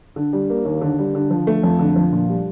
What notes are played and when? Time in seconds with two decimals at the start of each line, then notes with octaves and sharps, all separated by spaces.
0.16 D3
0.33 G3
0.50 A#3
0.65 D#2
0.81 D3
0.99 G3
1.15 D3
1.31 F3
1.47 A3
1.63 F2
1.79 D3
1.96 F3
2.13 A#2
2.29 G3